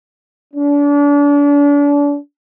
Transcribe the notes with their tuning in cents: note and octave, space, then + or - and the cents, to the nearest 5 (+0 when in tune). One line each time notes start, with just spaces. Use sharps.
D4 -35